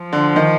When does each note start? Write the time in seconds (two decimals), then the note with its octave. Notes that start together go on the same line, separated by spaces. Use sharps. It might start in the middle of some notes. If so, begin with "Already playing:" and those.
Already playing: F3
0.13 D3
0.36 D#3